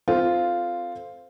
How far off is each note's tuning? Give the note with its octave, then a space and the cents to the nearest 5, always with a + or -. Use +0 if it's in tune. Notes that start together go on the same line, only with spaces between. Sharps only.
C4 -10 F4 +0 A4 +0